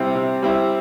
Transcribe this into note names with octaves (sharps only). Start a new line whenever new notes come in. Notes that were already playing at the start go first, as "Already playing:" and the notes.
Already playing: C3 G3 C4 E4
C3
G3 C4 E4